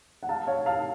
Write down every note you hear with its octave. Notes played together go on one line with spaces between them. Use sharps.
F#5
F5 A5
C#5 F5
F5 A5